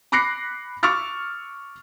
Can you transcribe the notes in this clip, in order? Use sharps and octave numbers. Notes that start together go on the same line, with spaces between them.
B5 D6 F#6 A#6 C7 C#7
C#6 D6 E6 F6 A6